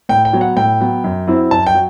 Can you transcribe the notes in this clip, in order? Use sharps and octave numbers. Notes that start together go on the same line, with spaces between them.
A2 G5
G5
F#3 B3
F#5
A2 G5
F#3 B3
F#2
F#3 C4 E4
F#2 A5
G5
F#3